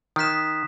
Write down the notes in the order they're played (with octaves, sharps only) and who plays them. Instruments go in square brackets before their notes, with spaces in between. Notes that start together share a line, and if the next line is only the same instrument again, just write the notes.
[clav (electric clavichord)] D#3 [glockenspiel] D#6 F#6 B6 E7